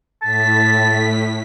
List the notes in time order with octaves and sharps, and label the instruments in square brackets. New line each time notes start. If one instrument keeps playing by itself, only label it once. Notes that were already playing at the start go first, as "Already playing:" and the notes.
[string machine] A2 B6 [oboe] A5